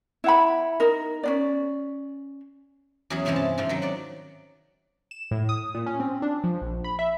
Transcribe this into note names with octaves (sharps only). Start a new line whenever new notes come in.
E4 F#5 B5
D#4 A#4
C#4 D4 D5
E2 F#3 C#4 F#4 G#4 F#5
G2 C3 E3 F3 G#3 C#4
A5
G#2 C3 F3
D#3 F#3
D5 F#5
E7
A2
D#6
A#2
C#4
C4
D4
F3
A#1
B5
E5